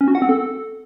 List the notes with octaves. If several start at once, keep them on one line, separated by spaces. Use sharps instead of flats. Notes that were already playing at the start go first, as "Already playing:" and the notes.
C#4
F#4
F#5
C4
A4